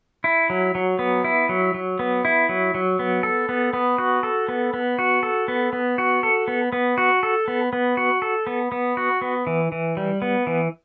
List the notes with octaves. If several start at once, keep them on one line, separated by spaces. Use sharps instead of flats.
E4
F#3
F#3
B3
E4
F#3
F#3
B3
E4
F#3
F#3
B3
A4
B3
B3
F#4
A4
B3
B3
F#4
A4
B3
B3
F#4
A4
B3
B3
F#4
A4
B3
B3
F#4
A4
B3
B3
F#4
B3
E3
E3
G3
B3
E3